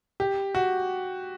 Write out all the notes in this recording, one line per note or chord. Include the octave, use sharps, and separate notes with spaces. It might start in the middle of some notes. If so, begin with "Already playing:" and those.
G4
F#4